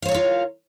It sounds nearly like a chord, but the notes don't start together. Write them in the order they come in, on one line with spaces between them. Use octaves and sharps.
F5 C5 C#5 A#4 F4